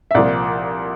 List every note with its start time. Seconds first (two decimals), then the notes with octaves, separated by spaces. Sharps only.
0.11 E5
0.15 C2 A#2 F3 D5